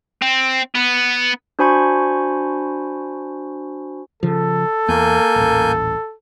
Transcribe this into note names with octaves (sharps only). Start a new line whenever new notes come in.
C4
B3
D4 F#4 C5 G#5 B5 C#6
C#3 F3 A4
E2 A#3 G#5 G6
D#1 A1